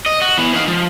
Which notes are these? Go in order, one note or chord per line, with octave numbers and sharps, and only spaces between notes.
D#5
F#4
E3 B3
D#4 F5
F3